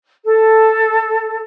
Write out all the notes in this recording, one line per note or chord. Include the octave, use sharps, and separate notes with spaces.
A4